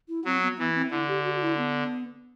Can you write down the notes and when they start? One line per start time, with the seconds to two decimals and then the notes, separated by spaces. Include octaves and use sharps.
0.08 E4
0.25 F#3 C4
0.42 B3
0.58 E3 B3
0.75 C4
0.91 D3 E4
1.08 G4
1.24 F#4
1.41 E4
1.57 B3